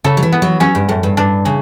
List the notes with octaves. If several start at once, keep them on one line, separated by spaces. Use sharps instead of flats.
C#3 A4
F#3
E3
B3
F#3
F#3 C#4
G2
F#2 A2
G2
G2 D4
C#3 E3